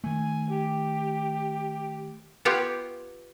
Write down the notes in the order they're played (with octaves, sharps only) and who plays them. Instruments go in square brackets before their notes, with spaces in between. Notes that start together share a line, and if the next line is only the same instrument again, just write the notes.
[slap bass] D#3 A3 [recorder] G#5
[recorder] G4
[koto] B3 F4 G4 C#5